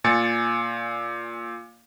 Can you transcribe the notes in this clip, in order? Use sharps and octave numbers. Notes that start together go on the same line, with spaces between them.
A#2 G#5 A6 C#7